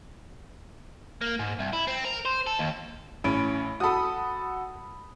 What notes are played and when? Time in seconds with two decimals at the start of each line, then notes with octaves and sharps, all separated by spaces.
1.21 A#3
1.39 G#2
1.59 C2
1.73 E4
1.88 C4
2.05 A#4
2.25 C5
2.47 A4
2.59 D#2
3.24 A1 C#4 B5 D7
3.80 F#4 A4 B5 D#6